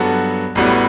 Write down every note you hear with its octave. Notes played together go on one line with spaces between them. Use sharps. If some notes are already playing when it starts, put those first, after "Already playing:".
Already playing: G2 F#3 B3 F#4 A4
A1 A2 G3 B3 F#4